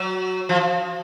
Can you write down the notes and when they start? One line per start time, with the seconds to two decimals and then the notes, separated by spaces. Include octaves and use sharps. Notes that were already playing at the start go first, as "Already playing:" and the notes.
Already playing: F#3
0.49 F3